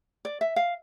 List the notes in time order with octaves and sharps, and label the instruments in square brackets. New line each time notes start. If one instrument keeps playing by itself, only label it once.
[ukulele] D5
E5
F5